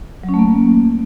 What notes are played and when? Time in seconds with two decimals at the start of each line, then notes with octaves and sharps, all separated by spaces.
0.24 F#3
0.29 C#4
0.34 A3
0.39 A#3